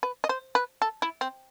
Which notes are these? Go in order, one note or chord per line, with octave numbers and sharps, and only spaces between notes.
B4
D#5
C5
B4
A4
E4
C4